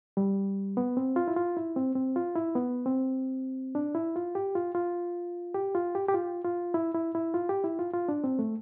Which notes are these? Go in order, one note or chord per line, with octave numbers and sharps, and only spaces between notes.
G3
B3
C4
F4
E4
F4
E4
C4
C4
F4
E4
B3
C4
D4
E4
F4
G4
F4
F4
G4
F4
G4
G4
F4
F4
E4
E4
E4
F4
G4
E4
F4
F4
D4
C4
A3